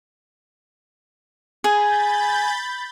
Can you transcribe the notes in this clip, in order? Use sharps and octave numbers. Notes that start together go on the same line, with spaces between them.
G#4 G#5 B5 G6 A6